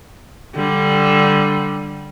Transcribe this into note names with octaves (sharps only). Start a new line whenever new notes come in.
D3 G3